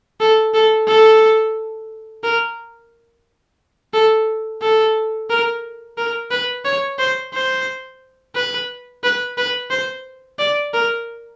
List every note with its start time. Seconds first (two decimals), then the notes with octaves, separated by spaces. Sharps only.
0.20 A4
0.54 A4
0.87 A4
2.24 A#4
3.94 A4
4.62 A4
5.30 A#4
5.97 A#4
6.31 B4
6.65 C#5
6.99 C5
7.33 C5
8.35 B4
9.04 B4
9.37 B4
9.70 C5
10.39 D5
10.74 A#4